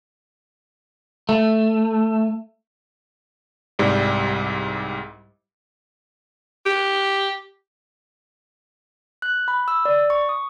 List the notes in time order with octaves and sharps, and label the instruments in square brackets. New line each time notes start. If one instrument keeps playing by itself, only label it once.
[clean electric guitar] A3
[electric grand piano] C2 G#2 G3
[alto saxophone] G4
[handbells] F#6
B5
E6
D5
C#6
D#6